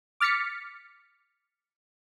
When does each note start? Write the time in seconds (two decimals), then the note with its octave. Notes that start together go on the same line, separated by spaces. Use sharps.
0.20 D6 F6 A6 B6 C#7